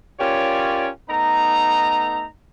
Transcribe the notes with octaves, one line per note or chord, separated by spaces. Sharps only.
C#4 F4 G4 A#4 C#5 D5
A3 B3 D#4 A#5